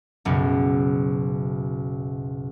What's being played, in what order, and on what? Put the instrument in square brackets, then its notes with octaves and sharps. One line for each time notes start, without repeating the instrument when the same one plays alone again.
[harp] F#1 B1